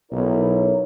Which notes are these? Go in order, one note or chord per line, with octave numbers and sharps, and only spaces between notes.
B1 E4 A#4 C#5